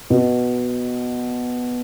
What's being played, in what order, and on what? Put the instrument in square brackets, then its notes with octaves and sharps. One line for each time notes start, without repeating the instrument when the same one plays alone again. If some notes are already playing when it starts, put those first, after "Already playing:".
[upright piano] B2